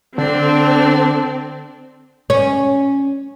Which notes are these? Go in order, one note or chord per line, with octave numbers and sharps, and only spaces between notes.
D3 C4 D4
C#4